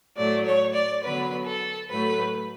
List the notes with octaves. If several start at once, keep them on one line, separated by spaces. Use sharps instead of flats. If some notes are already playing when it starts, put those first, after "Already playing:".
A2 F#3 A3 D5
C#5
D5
D3 F#3 B3 B4
A4
A2 F#3 A3 B4